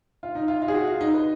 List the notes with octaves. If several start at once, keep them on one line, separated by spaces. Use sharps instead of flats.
F4
D#4
F4
F4
G#4
F#4
F4
D#4
B4